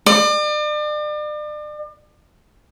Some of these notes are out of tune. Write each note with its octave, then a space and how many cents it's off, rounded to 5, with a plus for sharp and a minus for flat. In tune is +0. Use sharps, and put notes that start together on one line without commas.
D5 +40